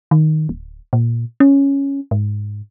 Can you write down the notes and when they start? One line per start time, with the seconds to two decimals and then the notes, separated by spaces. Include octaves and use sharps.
0.11 D#3
0.49 D1
0.93 A#2
1.40 C#4
2.11 G#2